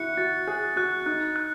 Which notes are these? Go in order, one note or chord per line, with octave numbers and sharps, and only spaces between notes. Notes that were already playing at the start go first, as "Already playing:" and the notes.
Already playing: E4 F#4 F#6 C#7
F#4 A6
G#4 F#6
F#4 F#6
D#4 F#6
F#6